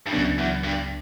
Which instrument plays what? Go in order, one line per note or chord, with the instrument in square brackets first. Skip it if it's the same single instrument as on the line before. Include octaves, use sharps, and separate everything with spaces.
[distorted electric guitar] G2
[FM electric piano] C#2 C#3 F#3 B3 D4 [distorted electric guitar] F#2
[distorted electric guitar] E2
G2